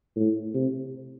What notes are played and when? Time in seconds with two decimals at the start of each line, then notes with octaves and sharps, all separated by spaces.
0.16 A2
0.54 C3